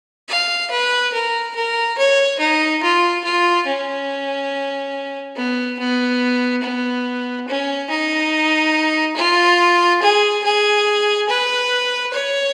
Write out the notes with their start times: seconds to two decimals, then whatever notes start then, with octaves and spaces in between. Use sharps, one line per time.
0.29 F5
0.71 B4
1.13 A#4
1.55 A#4
1.98 C#5
2.39 D#4
2.83 F4
3.24 F4
3.66 C#4
5.36 B3
5.79 B3
6.63 B3
7.48 C#4
7.90 D#4
9.16 F4
10.02 G#4
10.44 G#4
11.29 B4
12.13 C#5